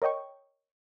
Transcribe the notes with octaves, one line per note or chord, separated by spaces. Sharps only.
A#4 C#5 D#5 G5 C#6